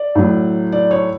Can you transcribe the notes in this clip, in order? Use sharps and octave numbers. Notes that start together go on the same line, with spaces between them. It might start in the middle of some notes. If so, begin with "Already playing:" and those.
Already playing: D5
A2 F#3
D5
C#5